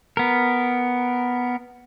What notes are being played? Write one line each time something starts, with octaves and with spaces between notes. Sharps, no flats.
B3 A#4